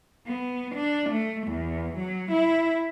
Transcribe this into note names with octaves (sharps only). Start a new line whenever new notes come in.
B3
D4
A3
E2
F#3
E4